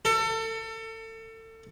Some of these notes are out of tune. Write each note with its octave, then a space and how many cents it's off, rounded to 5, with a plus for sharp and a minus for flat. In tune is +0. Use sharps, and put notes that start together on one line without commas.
A4 +30